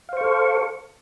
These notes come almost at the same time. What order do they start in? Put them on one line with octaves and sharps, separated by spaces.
F5 C5 C#6 A4